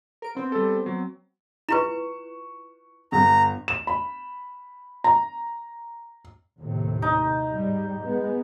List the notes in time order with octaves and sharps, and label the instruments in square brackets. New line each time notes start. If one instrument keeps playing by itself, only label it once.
[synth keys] A#4 D7
B3 C4
[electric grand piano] G3 A4
F#3
[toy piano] E4 F4 B4 [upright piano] C#6 E7
[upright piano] G1 [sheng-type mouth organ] A#5
[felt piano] E7
B5
A#5
[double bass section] D#2 A2 C3
[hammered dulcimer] D#4
[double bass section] G#2 G3
G#3 B3